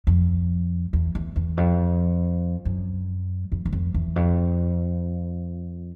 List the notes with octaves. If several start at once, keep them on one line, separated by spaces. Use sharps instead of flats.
F2
E2
E2
E2
F2
F#2
F2
E2
F2
E2
F2